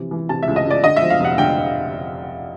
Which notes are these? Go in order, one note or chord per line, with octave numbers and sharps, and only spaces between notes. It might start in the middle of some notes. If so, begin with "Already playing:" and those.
Already playing: C3 E3 F3
E3
C3 A5
C#2 E5
D#5
C#2 D5
D3 D#5
E5
F3
F5
F1 F#5
D3 G5